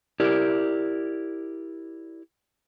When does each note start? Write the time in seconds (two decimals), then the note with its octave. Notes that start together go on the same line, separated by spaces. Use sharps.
0.20 E4 G4 A#4 D5